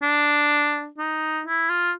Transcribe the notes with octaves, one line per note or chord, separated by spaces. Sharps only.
D4
D#4
E4
F4